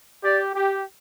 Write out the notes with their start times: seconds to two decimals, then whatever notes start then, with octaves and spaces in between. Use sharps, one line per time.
0.24 G4 D5
0.55 G4